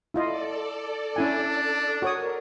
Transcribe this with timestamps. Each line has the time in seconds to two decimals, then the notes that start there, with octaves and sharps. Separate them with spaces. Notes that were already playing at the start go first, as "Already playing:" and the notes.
0.14 E4 F4 A4 D5 D#5
1.16 C#4 D4 E4 G#5
2.02 F#4 A#4 C#5 D#6